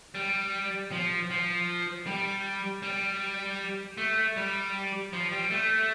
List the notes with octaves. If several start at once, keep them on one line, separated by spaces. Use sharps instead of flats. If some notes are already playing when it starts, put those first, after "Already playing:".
G3
F3
F3
G3
G3
A3
G3
F3
G3
A3